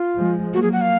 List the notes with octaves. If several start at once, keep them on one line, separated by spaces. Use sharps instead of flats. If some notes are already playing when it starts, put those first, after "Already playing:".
Already playing: F4
F3 G#3
F#3 A#3 F#4
G#4
F#5
F5